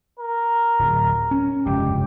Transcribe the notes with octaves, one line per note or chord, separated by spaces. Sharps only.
A#4
D1
C#4
F1 C#2 G2 G4